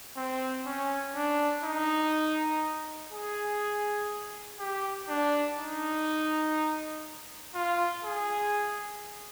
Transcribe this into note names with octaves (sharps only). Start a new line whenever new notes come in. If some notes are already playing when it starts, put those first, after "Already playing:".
C4
C#4
D4
D#4
G#4
G4
D4
D#4
F4
G#4